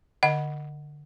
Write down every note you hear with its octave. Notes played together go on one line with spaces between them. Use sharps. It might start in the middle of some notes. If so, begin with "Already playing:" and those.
D3 D#5 F#5